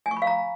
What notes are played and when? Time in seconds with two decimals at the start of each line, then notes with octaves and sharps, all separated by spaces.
0.06 G#5
0.11 C#6
0.16 B5
0.22 F5
0.27 A#5